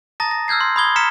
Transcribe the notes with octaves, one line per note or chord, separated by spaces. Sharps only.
A5 A#5 D#6 A6 A#6
A#6
E6 F6 G6 G#6 C7
C6
B5 C6 D#6 G#6 G7
A#5 F6 B6 C#7 E7